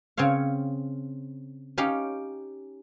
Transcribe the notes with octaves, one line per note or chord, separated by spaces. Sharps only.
C#3 C4 C5 C#5 F5
C#4 D#4 G4 F5